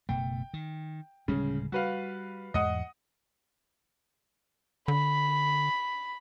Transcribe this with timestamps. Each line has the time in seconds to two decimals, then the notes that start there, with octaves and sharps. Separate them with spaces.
0.09 F#1 B2 A3 G5
0.54 D#3
1.28 D1 C#3 G3 G#3
1.72 G3 F#4 B4 F5
2.54 E2 G#2 G#3 D#5 F#5 D#6
4.88 D3 B5